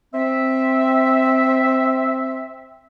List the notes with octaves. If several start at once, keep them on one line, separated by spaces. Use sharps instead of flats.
C4 E5